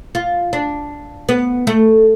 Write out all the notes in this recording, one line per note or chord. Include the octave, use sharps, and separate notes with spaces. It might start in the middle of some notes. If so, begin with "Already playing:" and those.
F4
D4
B3
A3